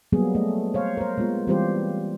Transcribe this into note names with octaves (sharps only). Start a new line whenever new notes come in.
F#3 G3 A#3 B3 G#4
A3 D#5
C5 C#5 F5
A#4 C5
G#3 A#3 B3 F4
E3 G3 C4 F4 G4 C5